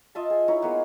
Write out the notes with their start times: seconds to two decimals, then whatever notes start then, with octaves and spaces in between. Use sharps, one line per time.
0.15 F4 D#5 E5 A5
0.30 G#4
0.48 D#4 E4 C#5 A#5
0.62 G#3 A#3 B3